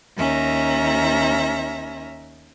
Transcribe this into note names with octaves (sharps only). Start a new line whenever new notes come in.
D#2 C#4 E5 A#5